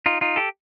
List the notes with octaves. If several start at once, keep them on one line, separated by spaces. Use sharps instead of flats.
D#4 F4
D#4 F4
G4 A4